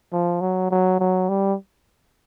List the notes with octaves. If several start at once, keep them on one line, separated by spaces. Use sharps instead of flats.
F3
F#3
F#3
F#3
G3